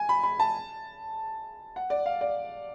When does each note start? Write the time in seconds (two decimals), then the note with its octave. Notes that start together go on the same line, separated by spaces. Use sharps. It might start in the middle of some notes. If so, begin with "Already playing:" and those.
Already playing: G#5
0.09 B5
0.24 B5
0.40 A5
1.76 F#5
1.90 D5
2.06 F5
2.21 D5